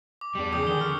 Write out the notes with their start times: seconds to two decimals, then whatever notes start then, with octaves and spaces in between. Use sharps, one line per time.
0.21 D6
0.35 E2 G3 D4
0.52 C#3 F3 G#4 D6 D#6 G6
0.67 D3 D#3 G7
0.81 C#6 F6